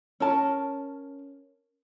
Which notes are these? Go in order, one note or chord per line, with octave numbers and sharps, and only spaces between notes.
C#4 A#4 A5